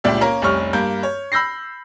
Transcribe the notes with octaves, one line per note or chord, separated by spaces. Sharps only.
G1 C#2 A#2 D4 G4 E5
A#3 C#4 A#4
F1 C2 G3 C#4 C#6 F6
G2 A#3 G6
C#5
B5 E6 G6 A#6 C7